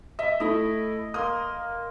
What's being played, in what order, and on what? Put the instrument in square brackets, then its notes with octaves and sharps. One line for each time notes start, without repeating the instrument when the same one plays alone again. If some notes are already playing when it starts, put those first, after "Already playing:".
[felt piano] D#5 [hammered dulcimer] E5
[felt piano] A3 E4 [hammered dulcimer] D#5
[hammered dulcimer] A#3 C6 [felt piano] D#6